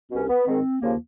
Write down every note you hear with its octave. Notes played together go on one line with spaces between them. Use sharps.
C2 B2 C#4
B3
G#2 D#3 C4
D#2 C#3 F3 A#3